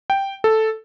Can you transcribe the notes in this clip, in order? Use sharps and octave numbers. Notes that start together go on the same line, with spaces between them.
G5
A4